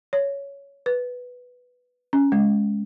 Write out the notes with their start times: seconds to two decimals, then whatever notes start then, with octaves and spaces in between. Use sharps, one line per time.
0.13 C#5
0.86 B4
2.13 C#4
2.32 G#3